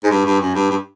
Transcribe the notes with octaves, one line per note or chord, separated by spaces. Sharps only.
G#2
G2
G2
F#2
G2
G2